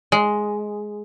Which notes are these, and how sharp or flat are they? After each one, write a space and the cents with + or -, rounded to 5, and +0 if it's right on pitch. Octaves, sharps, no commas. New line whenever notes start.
G#3 +5